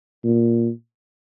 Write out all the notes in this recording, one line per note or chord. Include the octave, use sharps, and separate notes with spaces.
A#2